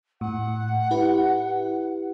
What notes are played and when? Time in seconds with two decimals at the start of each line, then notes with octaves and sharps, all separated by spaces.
0.21 A2 F#5
0.91 E4 G4 B4